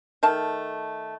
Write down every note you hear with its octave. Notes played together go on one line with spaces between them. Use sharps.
D#3 A3 A5